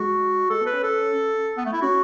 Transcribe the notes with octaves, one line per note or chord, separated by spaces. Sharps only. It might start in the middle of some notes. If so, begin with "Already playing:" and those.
Already playing: G#3 F#4
G#3 A4
B3
B4
C#4
A4
B3
A3
E4
C#4 F#4